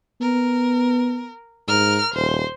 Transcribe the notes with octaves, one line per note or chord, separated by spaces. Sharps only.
B3 A#4
G#2 A#4 F6
D#1 C5